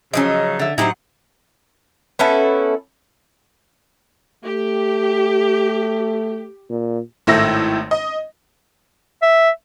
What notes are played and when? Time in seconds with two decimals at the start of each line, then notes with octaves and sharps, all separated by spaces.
0.14 C#3 F3 F#3 C#4 D#4 D#5
0.59 D3 E5
0.78 A2 F#3 D#4 E4 G4 C5 F#5
2.19 B3 C#4 E4 A4
4.45 A3 G4
6.70 A#2
7.27 G#1 A2 A3 E6 A#6
7.91 D#5
9.22 E5